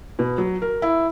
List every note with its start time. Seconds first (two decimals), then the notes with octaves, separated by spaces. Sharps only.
0.19 B2
0.38 F#3
0.62 A#4
0.82 E4